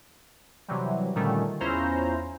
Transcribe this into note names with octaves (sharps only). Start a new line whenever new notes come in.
C3 E3 F#3 G3
A#2 D3 D#3 G3 A3 C#4
E2 C#4 E4 F4 C5 A#5